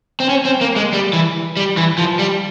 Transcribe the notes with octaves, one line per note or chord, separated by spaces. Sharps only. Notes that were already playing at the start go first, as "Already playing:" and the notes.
C4
C#4
C4
A#3
G#3
G3
E3
G3
E3
F3
G3